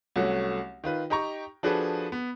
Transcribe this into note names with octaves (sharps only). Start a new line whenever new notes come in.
C2 F#3 A3 C#4 F#4
D#3 F4 B4
D#4 G4 G5 A#5 C#6
F3 D4 F#4 G#4 A4 B4
B3